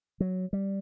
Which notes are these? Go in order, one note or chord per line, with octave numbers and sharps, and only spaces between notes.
F#3
G3